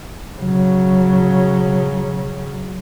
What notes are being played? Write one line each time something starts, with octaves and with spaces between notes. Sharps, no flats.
C#3 F#3